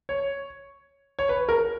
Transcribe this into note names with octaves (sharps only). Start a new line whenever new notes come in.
C#5
C#5
B4
A#4